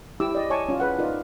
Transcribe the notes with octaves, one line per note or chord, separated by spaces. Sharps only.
E4 G4 D6 E6
D5 D#5
C#5 D#5 G#5 A5 C#6 D6
C#4 F4
G#4 B4 F#5
D#4 F4 A#4 D5 D#5